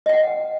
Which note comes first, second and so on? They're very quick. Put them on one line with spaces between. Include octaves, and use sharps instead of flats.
D#5 G5 F#5